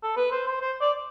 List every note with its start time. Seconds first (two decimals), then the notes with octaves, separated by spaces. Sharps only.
0.03 A4
0.17 B4
0.32 C5
0.47 C5
0.61 C5
0.81 D5